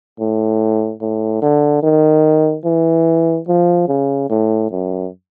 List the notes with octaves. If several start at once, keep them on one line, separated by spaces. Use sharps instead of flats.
A2
A2
D3
D#3
E3
F3
C#3
A2
F#2